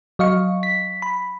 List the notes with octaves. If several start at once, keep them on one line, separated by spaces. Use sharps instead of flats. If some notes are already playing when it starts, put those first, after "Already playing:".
F#3 D#5 F5 C#6
B6
B5